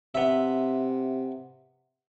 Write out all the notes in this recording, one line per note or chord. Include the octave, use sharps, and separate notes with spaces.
C3 B3 E5